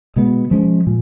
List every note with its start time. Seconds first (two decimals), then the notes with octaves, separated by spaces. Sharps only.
0.16 B2 G#3 B3
0.51 F3 G#3 C#4
0.87 A#2